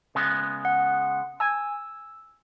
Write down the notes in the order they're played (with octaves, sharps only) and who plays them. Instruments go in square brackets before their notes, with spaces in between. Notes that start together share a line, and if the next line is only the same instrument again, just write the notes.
[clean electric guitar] C#3 G#3 B3
[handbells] F#5
[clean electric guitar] G#5 [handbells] E6